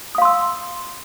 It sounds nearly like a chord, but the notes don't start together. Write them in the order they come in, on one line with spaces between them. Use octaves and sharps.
D#6 F5 C6 E6